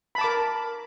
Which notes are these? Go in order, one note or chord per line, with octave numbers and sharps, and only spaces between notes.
A#4 A5 B5 D6